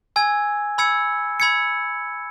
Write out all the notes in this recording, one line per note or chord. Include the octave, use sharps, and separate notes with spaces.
G#5 E6 G#6
B5 E6 G#6 C#7
B5 E6 G#6 C#7